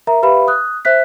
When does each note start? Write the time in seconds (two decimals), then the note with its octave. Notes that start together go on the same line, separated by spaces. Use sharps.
0.07 A#4 E5 A#5
0.23 G4 B4 E5 F5 B5
0.48 D#6 F#6
0.85 C5 E5 F#6 B6